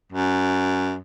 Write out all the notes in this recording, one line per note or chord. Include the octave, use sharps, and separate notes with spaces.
F#2